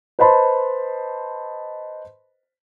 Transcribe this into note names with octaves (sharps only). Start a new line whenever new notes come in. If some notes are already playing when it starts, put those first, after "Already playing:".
B4 C5 D#5 A5 B5 C6